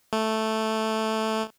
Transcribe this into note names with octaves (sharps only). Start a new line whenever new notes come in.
A3